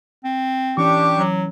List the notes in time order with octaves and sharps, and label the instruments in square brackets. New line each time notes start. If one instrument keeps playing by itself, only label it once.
[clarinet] C4
[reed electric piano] E3 C#4 [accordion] D4 G4 C#6 [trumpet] D6
[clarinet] F#3